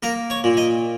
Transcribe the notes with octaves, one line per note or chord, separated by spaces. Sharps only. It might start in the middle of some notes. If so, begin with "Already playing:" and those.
A#3 A#4
C#5
A#2
D#5